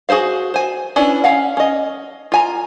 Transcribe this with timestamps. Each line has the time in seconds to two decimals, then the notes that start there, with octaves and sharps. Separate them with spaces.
0.09 F#4 G#4 A4 C5 F5
0.54 C5 G#5
0.96 C#4 D4 E4 B4
1.24 C#4 F5 F#5
1.57 C#4 D#5
2.32 F4 G#5 A#5